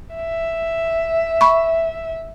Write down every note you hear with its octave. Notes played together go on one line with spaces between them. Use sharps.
E5
B5 C#6